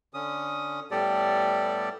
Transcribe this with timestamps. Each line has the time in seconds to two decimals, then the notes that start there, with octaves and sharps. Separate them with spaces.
0.14 D3 C#4 D#6
0.91 A2 G3 B3 G4 A4 D5